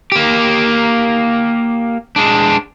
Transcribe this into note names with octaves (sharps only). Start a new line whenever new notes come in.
A#3 G4
G#3 D4